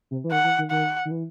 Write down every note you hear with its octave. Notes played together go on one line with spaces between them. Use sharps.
C3
E3
D#3 F#5
E3
D#3
D#3 F#5
D#3
E3